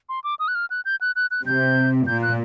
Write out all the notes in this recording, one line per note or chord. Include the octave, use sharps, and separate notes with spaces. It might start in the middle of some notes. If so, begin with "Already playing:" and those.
C6
D6
D#6
F#6
F6
F#6
G6
F#6
F#6
F#6
C3 G6
A#2 G6
F#6